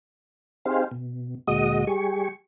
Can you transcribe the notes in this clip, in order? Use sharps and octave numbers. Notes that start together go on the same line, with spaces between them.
C4 D#4 G4 G#4 C5 F5
B2
D2 A#2 G#3 F#4 D#5 D#6
G3 G4 G#4 C#6